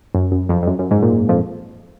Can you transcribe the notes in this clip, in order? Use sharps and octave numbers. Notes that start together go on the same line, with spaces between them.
F#2
F#2
F2
F2
F#2
F#2
G#2
A#2
F2